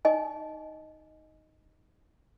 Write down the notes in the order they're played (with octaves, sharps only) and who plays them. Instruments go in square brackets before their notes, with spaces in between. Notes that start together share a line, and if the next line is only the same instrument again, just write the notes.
[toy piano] D#4 D#5 G#5